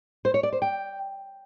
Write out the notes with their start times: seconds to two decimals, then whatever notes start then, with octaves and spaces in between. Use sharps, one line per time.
0.25 C5
0.34 C#5
0.43 D5
0.53 C5
0.62 G5